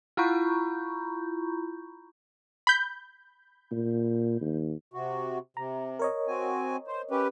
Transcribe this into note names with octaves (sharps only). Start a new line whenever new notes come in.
E4 F4 A#5 B5 C#6 G6
B5 G6
A#2
D#2
C3 F#4
C3 A#5
A#4 C#5 D#5
C4 F#4 G#5
C5
C#4 G4 B4